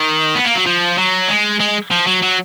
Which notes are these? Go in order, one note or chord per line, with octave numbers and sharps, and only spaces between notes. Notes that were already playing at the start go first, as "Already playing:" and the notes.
Already playing: D#3
B3
A#3
F#3
F3
F#3
G#3
G#3
F3
F#3
F#3